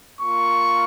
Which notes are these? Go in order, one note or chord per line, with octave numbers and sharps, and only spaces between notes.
A#3 F4 C#6